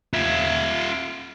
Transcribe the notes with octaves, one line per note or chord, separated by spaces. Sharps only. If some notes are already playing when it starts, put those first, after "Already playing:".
F4 E5